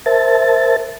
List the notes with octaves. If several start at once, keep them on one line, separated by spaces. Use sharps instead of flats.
A#4 C5 E5 A5 A6